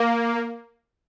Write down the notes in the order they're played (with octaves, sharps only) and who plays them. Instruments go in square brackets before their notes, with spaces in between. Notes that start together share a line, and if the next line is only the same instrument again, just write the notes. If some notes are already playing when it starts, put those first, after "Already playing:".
Already playing: [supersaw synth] A#3